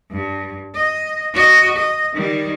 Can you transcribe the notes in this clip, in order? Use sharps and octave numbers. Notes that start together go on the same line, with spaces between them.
G2
D#5
F#4 D#5
D#5
D#3 G3